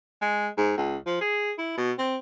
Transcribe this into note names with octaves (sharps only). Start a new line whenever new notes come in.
G#3
G#2
C#2
F3
G#4
E4
B2
C4